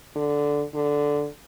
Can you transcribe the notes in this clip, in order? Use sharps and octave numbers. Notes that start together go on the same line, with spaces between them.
D3
D3